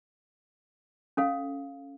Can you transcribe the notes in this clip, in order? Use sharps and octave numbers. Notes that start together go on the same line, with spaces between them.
C#4 A4 F5